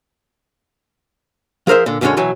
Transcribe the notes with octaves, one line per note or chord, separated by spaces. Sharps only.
F3 G#4 A#4 C5 E5
A#2 D3
B1 F#2 D3 G#3 C#4 C#5
B2 E3 F#3 G#5